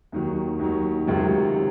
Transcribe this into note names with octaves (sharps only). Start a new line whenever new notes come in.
D#2 D#3 F#3
D#2 D#3 F#3
C#2 C3 D#3 F#3
C3